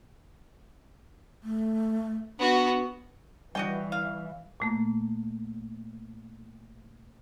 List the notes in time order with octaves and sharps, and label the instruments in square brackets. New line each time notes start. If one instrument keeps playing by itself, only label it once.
[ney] A3
[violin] B3 F#4 [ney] D4
[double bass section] E3 [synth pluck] G3 D5 C#6 [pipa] F#4 D#5 G5
[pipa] F5
[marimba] A#2 A3 A#3